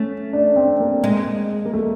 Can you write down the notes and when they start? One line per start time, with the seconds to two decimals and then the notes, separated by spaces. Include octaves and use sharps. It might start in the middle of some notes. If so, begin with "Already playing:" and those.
Already playing: A3 C#4
0.33 D4
0.56 C4
0.80 A#3
1.04 G#3
1.66 A#3
1.73 A3